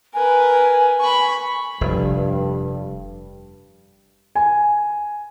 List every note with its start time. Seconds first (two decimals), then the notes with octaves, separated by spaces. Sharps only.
0.14 A#4 B4 G#5
1.00 B5 C#6
1.81 F1 G2
4.35 G#5